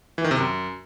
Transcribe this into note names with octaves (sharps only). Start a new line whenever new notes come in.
E3
D#3
C3
F#2